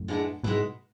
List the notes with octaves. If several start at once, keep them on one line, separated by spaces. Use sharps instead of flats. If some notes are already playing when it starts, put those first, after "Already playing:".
Already playing: F#2 A2
D3 G#3 B3 E4
G#2 B2 G#3 B3 E4 B4